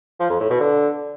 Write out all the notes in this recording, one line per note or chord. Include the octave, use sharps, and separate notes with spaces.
F3
F2
A2
B2
D3